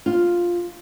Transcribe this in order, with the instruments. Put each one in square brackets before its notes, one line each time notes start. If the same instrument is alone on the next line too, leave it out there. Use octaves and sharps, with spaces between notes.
[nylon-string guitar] F4